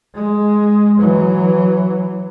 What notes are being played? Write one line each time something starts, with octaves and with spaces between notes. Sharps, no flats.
G#3
E3 F#3